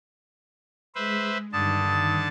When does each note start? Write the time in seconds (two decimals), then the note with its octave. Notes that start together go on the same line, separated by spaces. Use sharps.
0.95 G#3 B4 C5 E5
1.53 G2 D3 D#3 A5 D#6